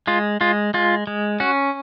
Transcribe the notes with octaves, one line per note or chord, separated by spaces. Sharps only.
G#3 F4
G#3 F4
G#3 F4
G#3
C#4 F#4